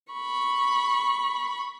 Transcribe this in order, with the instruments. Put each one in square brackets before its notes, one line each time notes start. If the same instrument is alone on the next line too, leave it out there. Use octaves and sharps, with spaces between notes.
[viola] B5 C#6